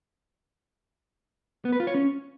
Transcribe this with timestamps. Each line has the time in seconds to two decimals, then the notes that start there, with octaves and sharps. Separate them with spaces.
1.65 B3
1.72 B4
1.80 F4
1.87 C#5
1.95 C#4